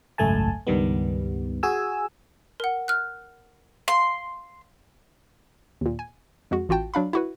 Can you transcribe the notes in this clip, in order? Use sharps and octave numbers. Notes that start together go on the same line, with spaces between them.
G#1 C#2 F#2 A3 G#5 A5
C#2 G2 D#3 G3 B3
F#4 G#4 G#5 E6
A#4 F#5
F6 F#6
F5 C6
D#2 A#2
G#5
F2 G#3 F#4
A1 F4 F#4 G5 A5
F#3 D4 F5 B5
E4 F#4 B4